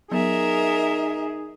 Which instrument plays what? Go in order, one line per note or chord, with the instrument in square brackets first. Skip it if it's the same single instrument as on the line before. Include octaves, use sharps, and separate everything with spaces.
[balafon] F#3 B3 [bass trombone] D#4 [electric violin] G#4 [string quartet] A#4 E5